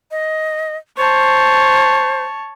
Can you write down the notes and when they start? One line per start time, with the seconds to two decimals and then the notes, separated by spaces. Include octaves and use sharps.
0.11 D#5
0.97 C5 C#5 A5